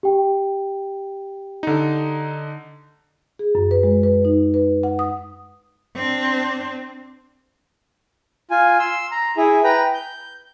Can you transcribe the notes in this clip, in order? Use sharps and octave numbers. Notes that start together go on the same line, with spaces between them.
G4 G5
D3 D#4
G#4
F#2
B4
G#3
B4
D#4
B4
F#5
D#6
C4 D4
F4 G#5
C6 E6
A#5
E4 G#4
B4 G5 A#5
G6